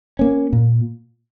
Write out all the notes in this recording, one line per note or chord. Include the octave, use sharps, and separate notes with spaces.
A#3 C#4
A#2